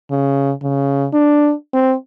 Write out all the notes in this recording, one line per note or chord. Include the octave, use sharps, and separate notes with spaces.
C#3
C#3
D4
C4